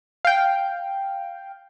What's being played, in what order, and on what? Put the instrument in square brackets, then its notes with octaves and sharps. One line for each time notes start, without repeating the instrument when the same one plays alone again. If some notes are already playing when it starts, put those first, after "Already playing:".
[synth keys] F5 G5